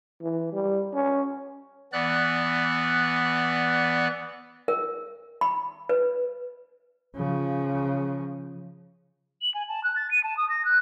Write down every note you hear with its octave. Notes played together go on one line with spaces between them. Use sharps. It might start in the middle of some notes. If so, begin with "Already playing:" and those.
E3
G3
C#4
E3 B3 D5 F#6
A#4
B5
B4
C#3 F3
F#7
G#5
A5
F#6
A6
D#7
A5
D#6
A#6
F#6